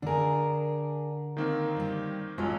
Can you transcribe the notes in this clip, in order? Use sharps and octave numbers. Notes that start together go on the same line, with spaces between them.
D3 D4 G#4 A#4
D#3 A#3 C4
G3 G4
A1 F#3 G#3 F4